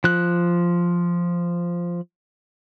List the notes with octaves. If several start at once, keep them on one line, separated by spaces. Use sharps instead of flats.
F3 F#6